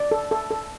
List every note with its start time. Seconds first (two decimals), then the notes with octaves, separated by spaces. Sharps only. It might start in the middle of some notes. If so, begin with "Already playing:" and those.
Already playing: D5
0.11 A4
0.31 A4
0.51 A4